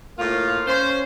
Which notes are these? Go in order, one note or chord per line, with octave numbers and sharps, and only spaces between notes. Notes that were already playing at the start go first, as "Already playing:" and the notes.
A2 A#3 F4
C#4 C5